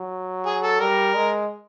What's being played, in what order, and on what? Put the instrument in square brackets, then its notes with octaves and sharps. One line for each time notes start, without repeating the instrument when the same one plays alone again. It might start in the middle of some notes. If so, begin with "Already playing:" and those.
Already playing: [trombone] F#3
[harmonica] G#4
A4
[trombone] G3 [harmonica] A#4
[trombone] G#3